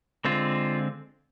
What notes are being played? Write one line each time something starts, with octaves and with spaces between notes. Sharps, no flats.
D3 G#3 C4 F4